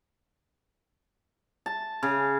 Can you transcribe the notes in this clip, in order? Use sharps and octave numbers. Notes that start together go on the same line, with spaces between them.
A5
C#3